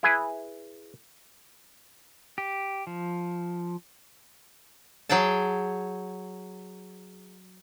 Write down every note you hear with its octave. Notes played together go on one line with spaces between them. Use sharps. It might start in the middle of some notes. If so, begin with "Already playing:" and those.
E4 G#4 B4 G#5
G4
F3
F#3 G#4 G5 A5